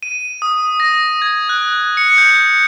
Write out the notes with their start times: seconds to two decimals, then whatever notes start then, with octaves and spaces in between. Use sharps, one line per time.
0.03 D#7
0.42 D#6
0.80 A#6
1.22 G#6
1.49 F#6
1.97 C#7
2.18 G6